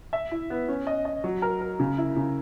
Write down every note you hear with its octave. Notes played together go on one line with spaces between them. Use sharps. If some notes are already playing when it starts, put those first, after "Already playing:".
E5
E4
B3
C#4
D#5
D#5
F#3
A#4
A#4
C#3
E4
C#3